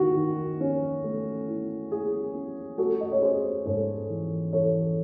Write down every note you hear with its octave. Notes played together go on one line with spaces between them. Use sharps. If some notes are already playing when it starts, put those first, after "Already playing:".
Already playing: D#3 E4 F#4
D#3
C#4
A3
E4
E4 G#4
C#4
A3 F#4 A4
D#5
C#5
C#4 G#4 C5
G#2 A4 C#5
E3
E3 A4 C#5